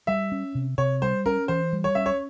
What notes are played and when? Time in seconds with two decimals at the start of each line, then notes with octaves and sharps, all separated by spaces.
0.07 G3 E5
0.32 C#4
0.55 C3
0.78 C3 C#5
1.02 G3 C5
1.26 C#4 A#4
1.48 E3 C5
1.73 G3
1.84 C#5
1.95 C#4 E5
2.06 C#5